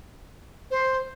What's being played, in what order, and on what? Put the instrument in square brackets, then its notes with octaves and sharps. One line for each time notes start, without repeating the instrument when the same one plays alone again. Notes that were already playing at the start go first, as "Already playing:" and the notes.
[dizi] C5